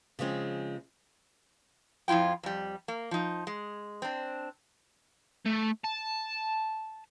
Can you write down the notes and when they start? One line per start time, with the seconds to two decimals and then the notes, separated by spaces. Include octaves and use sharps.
0.19 C#3 F3 G#3 C4
2.08 F2 F3 E4 F4 G5
2.43 F2 G3
2.88 A#3
3.11 F3 D#4
3.47 G#3
4.02 C4 D4
5.46 A3
5.84 A5